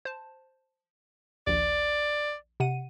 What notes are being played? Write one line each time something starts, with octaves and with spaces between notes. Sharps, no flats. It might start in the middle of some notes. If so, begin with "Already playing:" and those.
C5 A5
A#1 D#2 D5
C3 F#5 D#7